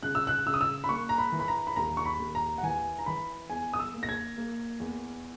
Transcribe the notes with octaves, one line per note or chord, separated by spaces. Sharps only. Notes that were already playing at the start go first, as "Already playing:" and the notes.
C#3 F#6
E6
F#6
C#3 E6
D#6
E6
B5
A#3 C#6
A#5
B5
E3
B5
A#5
B5
D#2 A#5
C#6
B5
D#2
A#5
F#5
E3 G#5
A#5
E3 B5
E2 G#5
D#6
E6
A#3
A#6
G#6
A#3
E2